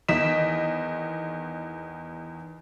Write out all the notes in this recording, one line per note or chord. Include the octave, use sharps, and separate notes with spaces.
E2 D#3 D#5 B6 E7